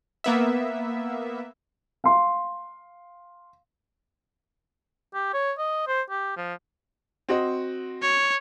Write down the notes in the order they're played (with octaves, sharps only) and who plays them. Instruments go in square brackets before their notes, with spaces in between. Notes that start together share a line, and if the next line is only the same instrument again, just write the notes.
[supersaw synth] A#3 B3 E5
[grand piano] F5 C6
[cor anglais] G4
C#5
D#5
C5
G4
F3
[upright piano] C4 F#4 D#5
[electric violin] C#5